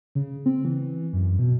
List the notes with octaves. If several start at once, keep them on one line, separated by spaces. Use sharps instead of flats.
C#3
C4
E3
F#2
B2